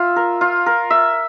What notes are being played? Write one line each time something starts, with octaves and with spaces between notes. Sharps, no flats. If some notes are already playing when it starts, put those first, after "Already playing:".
Already playing: F4 E5
A#4
F4
A#4
E5